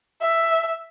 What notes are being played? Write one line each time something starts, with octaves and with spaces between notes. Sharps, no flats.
E5